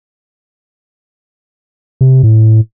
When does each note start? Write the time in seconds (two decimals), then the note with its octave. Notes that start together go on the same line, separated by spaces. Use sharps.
2.01 C3
2.23 A2